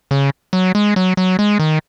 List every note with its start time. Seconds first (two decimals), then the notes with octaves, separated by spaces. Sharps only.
0.11 C#3
0.53 F#3
0.75 G#3
0.96 F#3
1.17 F#3
1.39 G#3
1.59 D#3